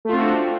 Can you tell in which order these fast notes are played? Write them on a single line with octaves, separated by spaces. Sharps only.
A3 F4 C4 F#4 D4